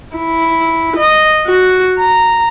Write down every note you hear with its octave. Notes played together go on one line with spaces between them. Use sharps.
E4
D#5
F#4
A#5